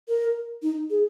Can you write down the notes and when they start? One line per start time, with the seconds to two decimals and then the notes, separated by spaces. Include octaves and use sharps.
0.08 A#4
0.62 D#4
0.90 G#4